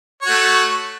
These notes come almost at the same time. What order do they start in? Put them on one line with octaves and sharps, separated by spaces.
C#5 F#4 A3